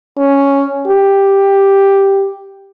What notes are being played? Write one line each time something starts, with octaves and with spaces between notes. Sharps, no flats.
C#4
G4